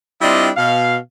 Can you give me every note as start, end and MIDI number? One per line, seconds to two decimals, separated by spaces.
0.21 0.49 55
0.21 0.49 60
0.21 0.49 62
0.21 0.49 64
0.21 0.49 65
0.21 0.49 75
0.57 0.97 47
0.57 0.97 77